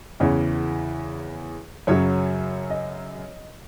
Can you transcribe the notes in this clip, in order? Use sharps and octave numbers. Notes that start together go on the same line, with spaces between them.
E2 C#3 E3 C#5
F#2 C#3 F#3 C#5
D#5